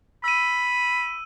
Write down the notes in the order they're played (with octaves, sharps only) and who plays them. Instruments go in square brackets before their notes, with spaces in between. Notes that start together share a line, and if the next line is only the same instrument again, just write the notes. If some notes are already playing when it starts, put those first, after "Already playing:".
[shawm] B5 [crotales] E6 D#7